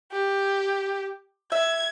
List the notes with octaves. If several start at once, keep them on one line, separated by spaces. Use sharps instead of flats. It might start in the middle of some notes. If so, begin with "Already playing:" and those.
G4
E5 G#6